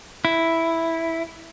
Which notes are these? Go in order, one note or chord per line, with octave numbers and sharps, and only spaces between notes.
E4